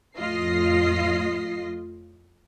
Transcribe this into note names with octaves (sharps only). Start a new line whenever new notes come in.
F2 A2 F4 D#5 A#6 C7